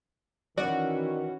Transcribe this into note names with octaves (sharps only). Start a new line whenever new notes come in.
D#3 E3 C#4 F#4 D5